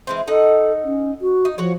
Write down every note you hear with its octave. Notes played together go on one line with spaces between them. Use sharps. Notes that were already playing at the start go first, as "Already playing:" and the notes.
E3 G#3 C4
D#4 A4 D#5 F#5
C#4
F#4
D#4
F3 F#4 C#5